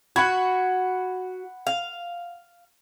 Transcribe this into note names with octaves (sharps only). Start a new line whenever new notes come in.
F#4 F#5 B5 G#6
F5